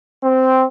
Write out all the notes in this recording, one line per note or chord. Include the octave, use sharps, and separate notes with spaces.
C4